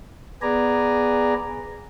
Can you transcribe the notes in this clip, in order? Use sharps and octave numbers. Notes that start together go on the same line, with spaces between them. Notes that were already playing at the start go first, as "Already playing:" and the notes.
B3 G#4 B4 D5 G#5 A#5